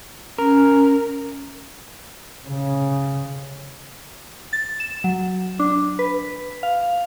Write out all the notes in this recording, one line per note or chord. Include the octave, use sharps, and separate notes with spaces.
C#4 A#4
C#3
A6
E7
F#3
D4
B4
F5